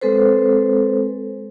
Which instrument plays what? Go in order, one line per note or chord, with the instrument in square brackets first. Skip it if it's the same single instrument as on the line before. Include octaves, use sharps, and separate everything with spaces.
[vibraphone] G#3 C4 A4 B4 C5